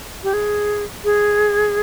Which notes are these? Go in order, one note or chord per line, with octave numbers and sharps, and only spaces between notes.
G4
G#4
G#4